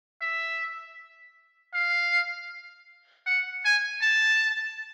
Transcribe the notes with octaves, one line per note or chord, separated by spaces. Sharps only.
E5
F5
F#5
G#5
A5